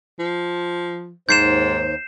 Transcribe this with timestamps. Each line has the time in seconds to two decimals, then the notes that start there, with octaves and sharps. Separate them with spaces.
0.19 F3
1.29 D#2 G#2 C5 G6 C7 E7